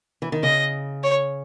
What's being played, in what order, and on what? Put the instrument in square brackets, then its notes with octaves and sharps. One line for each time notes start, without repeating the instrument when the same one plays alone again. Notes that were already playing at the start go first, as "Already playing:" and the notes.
[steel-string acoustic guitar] E3
D#3
[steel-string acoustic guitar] C#3 [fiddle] D#5
[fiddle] C#5